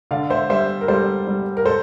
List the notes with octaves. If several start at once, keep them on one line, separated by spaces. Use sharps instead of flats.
D3 D5 F5
C5 E5
G3 C5 E5
A#4
G3 A4 C5
G3
A#4
A4 C5